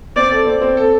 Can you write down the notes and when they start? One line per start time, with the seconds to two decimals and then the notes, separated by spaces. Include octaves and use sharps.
0.16 C4 D5
0.31 A4
0.47 C4
0.62 C4
0.77 A4